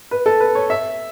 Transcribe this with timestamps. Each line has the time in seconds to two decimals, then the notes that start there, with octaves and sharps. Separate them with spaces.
0.11 B4
0.26 A4
0.40 B4
0.55 C#5
0.70 E5